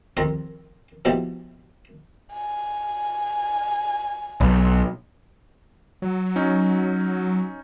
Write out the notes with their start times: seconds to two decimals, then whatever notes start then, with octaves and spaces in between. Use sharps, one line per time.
0.17 C2 F2 D#3 A#4 C6
1.05 B2 F3 B3 D#4 E4 G4
2.33 G#5
4.41 B1
6.02 F#3
6.36 C#4 D#4